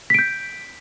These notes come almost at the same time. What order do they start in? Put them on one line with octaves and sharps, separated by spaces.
B6 D7 G6